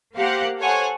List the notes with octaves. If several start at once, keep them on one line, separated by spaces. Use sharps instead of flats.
A#3 G4 C5 F5 F#5
A4 C5 C#5 F#5 G#5